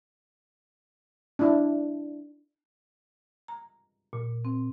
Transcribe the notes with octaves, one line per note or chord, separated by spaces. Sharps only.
D4 E4
A#5
A#2
C4